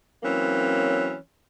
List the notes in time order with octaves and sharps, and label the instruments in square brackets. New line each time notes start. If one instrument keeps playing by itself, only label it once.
[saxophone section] E3 F#3 A#3 C4 C#4